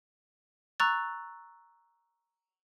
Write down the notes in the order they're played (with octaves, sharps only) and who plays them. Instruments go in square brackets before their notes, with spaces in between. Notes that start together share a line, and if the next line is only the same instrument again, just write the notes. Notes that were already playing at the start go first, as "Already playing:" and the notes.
[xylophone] A#5 C#6 E6 F#6 A6